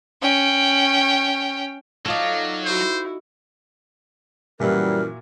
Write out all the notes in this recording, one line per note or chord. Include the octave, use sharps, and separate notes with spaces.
C#4 G5
F#3 D#4 F4 A4 D5 F5
E4 F#4 C5
F#2 A#2 E3 G3 E4 F#4 A#4